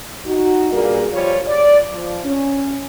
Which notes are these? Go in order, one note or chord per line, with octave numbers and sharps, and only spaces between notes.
D#4 F#4
G2 A#2 G3 A#3 G#4
F3 G3 F4 C#5
D5
F3
C#4